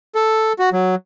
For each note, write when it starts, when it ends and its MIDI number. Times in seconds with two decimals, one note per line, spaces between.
0.15 0.53 69
0.59 0.70 66
0.73 0.95 54